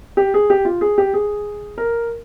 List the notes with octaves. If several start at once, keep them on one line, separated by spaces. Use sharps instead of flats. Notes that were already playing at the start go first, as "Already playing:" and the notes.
G4
G#4
G4
F4
G#4
G4
G#4
A#4